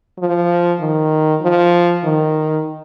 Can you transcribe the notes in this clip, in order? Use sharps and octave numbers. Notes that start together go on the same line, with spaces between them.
F3
D#3
F3
D#3